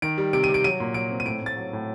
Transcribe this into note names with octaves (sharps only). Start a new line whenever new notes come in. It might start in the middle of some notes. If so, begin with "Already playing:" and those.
D#3 D7
G3
C3 D7
D#7
C3
D7
F#3 D#7
A#2
F#3 D7
C4
D#7
A2 D7
A2
A6
F#3
A2